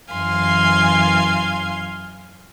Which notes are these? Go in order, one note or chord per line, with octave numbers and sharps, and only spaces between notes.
F#2 E3 F5 G#5 C6